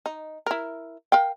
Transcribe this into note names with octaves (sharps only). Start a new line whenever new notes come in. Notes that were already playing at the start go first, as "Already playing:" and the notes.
D#4
E4 A#4
A#4 F5 G5